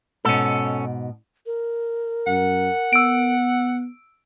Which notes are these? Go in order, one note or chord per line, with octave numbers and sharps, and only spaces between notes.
G#2 B2 C#4 A4
A#4
F#2 F#5
B3 E6 D7